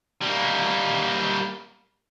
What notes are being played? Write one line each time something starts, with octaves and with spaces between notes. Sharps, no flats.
G3 A#3